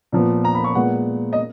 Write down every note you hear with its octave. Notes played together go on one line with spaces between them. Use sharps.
A#2 F3 B3
A#5
B5
C#6
A#2 G#3 B3 F#5
D#5